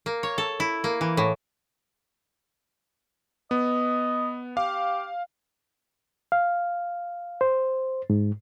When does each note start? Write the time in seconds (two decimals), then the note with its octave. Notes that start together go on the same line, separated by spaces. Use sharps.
0.06 A#3
0.23 C#5
0.38 A4
0.60 E4
0.84 A#3
1.01 E3
1.17 A2
3.51 B3 D#5
4.57 G4 F5
6.32 F5
7.41 C5
8.10 G#2